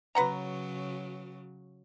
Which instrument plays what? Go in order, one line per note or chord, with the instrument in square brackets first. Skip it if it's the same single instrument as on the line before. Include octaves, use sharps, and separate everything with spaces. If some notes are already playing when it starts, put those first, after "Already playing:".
[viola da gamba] C#3 F#3 [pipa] B4 F#5 A#5